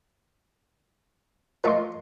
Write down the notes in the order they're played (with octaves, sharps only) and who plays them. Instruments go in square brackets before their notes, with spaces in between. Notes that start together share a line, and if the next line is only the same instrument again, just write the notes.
[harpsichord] F3 A3 [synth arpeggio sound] A#4 D#5 C6